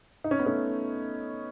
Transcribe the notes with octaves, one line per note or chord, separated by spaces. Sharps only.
D#4
C#4
B3
A3 C#4